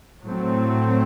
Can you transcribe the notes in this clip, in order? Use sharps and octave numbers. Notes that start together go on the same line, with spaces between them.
A2 F#3 A3 C4